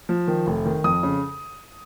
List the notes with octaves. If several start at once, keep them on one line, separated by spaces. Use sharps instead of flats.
F3
D#3
F1
D#3
F2 D#6
C#3